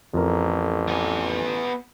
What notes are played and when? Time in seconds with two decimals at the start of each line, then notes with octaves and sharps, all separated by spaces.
0.14 A1 F2 A#4
0.89 B3 G#5